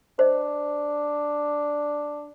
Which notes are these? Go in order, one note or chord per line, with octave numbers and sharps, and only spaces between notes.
D4 C5 D#5